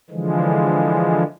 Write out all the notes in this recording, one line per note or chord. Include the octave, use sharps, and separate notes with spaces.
D3 E3 F3 G#3